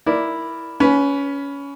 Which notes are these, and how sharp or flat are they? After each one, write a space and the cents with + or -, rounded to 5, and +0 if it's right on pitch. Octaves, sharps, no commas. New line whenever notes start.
E4 +0 A#4 +0 D5 +0
C#4 +20 B4 +0